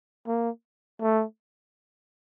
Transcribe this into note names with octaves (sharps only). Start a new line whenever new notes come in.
A#3
A3